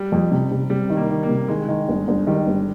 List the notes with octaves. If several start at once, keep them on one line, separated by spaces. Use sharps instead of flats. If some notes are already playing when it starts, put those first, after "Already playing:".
Already playing: G3
F2
C3
C3
C3 G3
D#3
A#3
D#3
A#3
C3
D#3 G#3
D#3
G1
G1
D#3 G3
G1